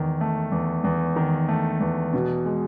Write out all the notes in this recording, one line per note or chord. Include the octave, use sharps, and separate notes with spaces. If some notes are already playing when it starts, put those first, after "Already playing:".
Already playing: E2 D#3
A3
E2
E2
D#3
A3
E2
B2
G#3